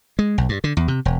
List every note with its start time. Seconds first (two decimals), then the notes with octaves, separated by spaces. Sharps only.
0.19 G#3
0.38 B1
0.49 G2
0.64 D3
0.77 E2
0.88 C3
1.05 E1